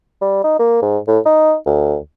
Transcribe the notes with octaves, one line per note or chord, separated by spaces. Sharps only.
G3
D#4
A#3
G#2
A2
D#4
D2